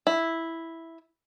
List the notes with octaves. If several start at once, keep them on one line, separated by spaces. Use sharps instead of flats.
E4